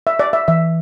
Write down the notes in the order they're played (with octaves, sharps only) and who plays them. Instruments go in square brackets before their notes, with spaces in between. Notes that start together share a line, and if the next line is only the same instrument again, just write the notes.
[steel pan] E5
D5
E5
[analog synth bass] E3 [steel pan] E5